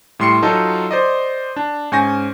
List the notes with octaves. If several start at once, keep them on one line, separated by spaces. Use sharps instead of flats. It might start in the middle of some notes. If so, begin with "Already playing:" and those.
A2 G3 C6 C7 C#7
F#3 D#4 F4 A4
C5 D5 D#5
D4
G#2 C#4 G#5 C#6 G6 A#6